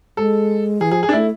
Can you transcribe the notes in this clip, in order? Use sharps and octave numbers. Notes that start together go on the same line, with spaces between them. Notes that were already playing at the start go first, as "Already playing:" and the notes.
G#3 A4
E3 G#4
F3 G#4
G#4
D4
A3 E4